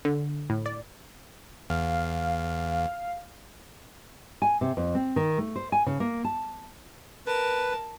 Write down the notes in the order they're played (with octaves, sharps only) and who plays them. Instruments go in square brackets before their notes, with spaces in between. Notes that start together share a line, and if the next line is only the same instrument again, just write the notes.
[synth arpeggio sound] D3
A2
D5
[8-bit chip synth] E2 [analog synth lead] F5
[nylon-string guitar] G#5
C3
F2
C4
D#3
A3
C5
G#5
C#3
A#3
A5
[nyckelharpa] A#4 A5 [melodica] B4